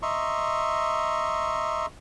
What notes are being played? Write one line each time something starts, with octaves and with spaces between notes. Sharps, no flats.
D#5 E5 A#5 C6 C#6